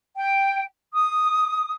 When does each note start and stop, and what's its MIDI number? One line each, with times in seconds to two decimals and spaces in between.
0.16 0.64 79
0.93 1.74 87